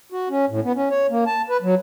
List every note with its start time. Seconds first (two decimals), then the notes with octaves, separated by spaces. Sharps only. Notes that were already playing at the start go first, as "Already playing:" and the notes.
0.12 F#4
0.30 C#4
0.50 A2
0.64 B3
0.75 C#4
0.90 C#5
1.10 A#3
1.26 A5
1.50 B4
1.62 F#3